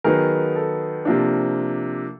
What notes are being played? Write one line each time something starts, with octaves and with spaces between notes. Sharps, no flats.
D#3 F#3 B3 D#4 G#4 A#4
A4
C3 F3 A#3 D4